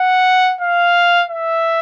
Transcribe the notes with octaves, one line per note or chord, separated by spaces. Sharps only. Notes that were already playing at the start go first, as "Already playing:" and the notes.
Already playing: F#5
F5
E5